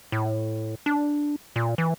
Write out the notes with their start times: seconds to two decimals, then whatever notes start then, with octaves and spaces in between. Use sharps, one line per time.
0.12 A2
0.86 D4
1.56 A#2
1.78 E3